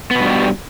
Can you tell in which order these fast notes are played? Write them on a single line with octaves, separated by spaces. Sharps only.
B3 B2 G2 G3